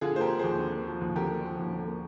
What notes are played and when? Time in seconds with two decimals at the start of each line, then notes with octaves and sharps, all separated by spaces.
0.01 D3 F4 G#4
0.16 A#3 C5
0.21 G4 A#4
0.30 F3
0.39 D#2 G#4 C5
0.59 D3
0.73 A#3
0.87 F3
1.01 D#2
1.16 D3 G4 A#4
1.30 A#3
1.45 F3
1.59 D#2
1.73 D3
1.87 A#3